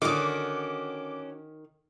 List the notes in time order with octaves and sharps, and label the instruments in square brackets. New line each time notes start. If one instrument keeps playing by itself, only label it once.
[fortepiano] D3 D#6 [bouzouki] D#3 [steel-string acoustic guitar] C#4 F#4 [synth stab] D6